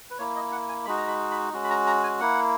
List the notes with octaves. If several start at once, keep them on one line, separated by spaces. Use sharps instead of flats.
B4
A#3 E4 C#5
D#5
F#5
G#5
G#3 D#4 F#4 B5
A#5
B5
B5
G#3 C#4 F#4
B5
A#5
A#5
G#5
A#3 E4 F#5